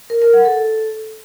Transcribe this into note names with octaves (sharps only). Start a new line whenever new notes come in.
A#4
A#4
F#5
A4